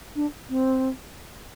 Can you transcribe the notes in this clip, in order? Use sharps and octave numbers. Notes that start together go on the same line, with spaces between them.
D4
C4